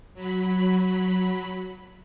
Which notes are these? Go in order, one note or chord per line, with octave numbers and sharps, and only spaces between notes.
F#3 B5